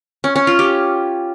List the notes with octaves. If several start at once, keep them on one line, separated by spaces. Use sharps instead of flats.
C#4
C#4
F4
G4